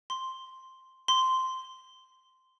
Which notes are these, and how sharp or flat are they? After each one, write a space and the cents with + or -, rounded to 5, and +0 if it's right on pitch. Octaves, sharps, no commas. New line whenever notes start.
C6 +0
C6 -10